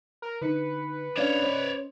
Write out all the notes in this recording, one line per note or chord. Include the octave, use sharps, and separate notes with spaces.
A#4
D3 D#4 B4 C#7
C#4 D4 C#5 D5 F5
C#4 C5 D#5